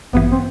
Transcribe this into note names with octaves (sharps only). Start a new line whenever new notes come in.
A1 G2 E3 B3
C4